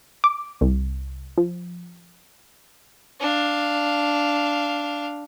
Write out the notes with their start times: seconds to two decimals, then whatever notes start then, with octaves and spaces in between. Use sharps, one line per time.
0.24 D6
0.61 C2
1.38 F3
3.20 D4 F5